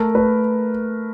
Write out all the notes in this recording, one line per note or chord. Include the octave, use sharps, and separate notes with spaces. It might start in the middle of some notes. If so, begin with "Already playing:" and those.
Already playing: A3 A#4
A3 B4